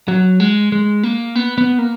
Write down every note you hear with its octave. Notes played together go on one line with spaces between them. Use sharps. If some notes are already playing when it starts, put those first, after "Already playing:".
F#3
G#3
G#3
A#3
B3
B3
A#3